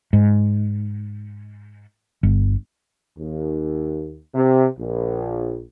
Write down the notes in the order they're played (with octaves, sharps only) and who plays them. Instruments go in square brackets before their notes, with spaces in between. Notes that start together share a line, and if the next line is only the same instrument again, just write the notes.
[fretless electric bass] G#2
G1
[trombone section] D#2
C3
A#1